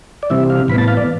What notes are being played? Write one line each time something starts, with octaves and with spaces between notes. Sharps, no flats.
D5
C3 E3 G3 C4 E5
F5
A2 E3 B3 B5
A5
F5
D5